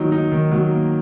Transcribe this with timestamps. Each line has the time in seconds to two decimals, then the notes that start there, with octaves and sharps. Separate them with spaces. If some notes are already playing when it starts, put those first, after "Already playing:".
Already playing: D#3 F#3 A#3 D#4
0.12 D#4
0.32 D#3
0.52 F#3
0.71 A#3